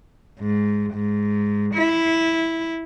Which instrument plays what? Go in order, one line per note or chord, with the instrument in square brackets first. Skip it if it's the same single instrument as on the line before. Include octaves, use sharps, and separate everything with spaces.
[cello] G#2
G#2
E4